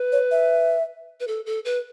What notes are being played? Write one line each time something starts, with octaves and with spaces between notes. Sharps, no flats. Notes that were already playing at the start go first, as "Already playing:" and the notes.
Already playing: B4
C#5
E5
B4
A4
A4
B4